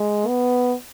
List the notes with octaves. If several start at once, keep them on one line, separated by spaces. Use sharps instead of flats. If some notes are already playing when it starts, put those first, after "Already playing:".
Already playing: G#3
B3